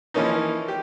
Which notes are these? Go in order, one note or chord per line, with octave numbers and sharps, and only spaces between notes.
E3 F3 A#3 C#4 D#4
G4